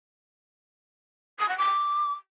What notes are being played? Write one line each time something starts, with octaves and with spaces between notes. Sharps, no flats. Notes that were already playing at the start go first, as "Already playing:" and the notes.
D#6
F#5
D6